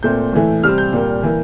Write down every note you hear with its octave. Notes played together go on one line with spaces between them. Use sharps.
A#2 A3 C4 G6
A2 E3 A3
C3 G3 C4 F6
G6
A#2 G3 A#3
E3 A#3